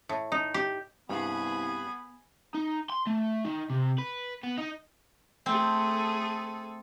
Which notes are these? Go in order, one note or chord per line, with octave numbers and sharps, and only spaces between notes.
A2
D#4
G4
C2 G2 B3 G#4 B5
D#4
C6
A3
D#3
C3
B4
B3
D#4
A3 C4 G#4 A4